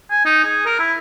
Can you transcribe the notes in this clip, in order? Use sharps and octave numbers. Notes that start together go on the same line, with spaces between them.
G#5
D#4
G#4
A#4
E4